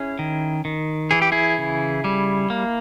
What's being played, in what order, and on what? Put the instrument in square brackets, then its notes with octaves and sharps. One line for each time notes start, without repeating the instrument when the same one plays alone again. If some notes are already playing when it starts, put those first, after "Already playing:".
Already playing: [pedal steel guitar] C#4 E4 G#4
D#3
D#3
E3 G#4
G4
E4 G#4
C#3
G3
A#3